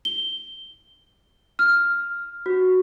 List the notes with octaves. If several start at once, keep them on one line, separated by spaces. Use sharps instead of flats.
G7
F6
F#4